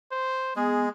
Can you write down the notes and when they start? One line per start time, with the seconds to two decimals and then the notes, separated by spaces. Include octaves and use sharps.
0.11 C5
0.56 G#3 B3 G#4